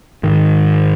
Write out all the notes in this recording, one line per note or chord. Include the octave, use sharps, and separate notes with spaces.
G#2 D#3